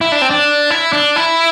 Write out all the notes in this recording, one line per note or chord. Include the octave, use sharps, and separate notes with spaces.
E4
D4
C4
D4
E4
D4
E4